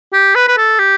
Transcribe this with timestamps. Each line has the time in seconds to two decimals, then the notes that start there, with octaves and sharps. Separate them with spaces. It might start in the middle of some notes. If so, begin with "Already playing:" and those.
0.13 G4
0.35 B4
0.48 B4
0.57 A4
0.79 G4